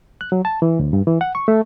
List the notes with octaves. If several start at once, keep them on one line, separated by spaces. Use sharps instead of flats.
F#6
F#3
A5
E3
D2
G2
E3
F#5
C#6
A3